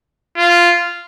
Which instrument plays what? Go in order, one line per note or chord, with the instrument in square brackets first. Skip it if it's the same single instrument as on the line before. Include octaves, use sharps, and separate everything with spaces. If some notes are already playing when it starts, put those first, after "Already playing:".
[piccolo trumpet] F4